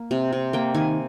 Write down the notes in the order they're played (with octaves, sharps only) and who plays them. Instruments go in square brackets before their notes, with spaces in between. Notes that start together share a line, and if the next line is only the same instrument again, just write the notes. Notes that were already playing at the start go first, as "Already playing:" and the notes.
Already playing: [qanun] A#3
C3
C3
A#3 G5
D#3 G#5